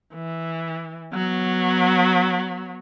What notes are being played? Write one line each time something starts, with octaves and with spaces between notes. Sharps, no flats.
E3
F#3 B3